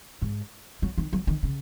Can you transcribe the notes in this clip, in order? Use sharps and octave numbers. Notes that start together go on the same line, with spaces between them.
G#2
F#3
D#3
F#3
D#3
C#3